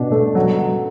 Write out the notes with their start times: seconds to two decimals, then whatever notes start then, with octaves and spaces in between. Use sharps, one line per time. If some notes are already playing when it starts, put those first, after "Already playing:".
Already playing: B2 D4
0.12 A3
0.35 F#3
0.59 F#3